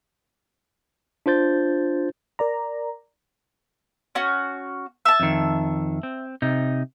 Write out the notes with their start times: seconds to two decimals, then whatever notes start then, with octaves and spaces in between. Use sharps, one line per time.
1.26 D4 F4 C5 G6 A6
2.39 A#4 D5 A#5
4.15 C#4 F#4
5.05 E5 A5
5.20 F2 D#3
6.03 C4
6.42 C3 D#4